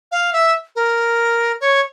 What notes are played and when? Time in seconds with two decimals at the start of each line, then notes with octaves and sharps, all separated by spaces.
0.12 F5
0.33 E5
0.76 A#4
1.61 C#5